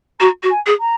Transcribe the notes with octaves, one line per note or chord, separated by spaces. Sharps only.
F#4 A#5
F#4
G#5
G#4
A#5